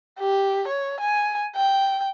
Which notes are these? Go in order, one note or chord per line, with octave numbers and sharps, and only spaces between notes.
G4
C#5
G#5
G5